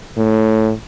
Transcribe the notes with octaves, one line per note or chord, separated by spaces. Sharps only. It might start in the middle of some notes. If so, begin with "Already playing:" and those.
A2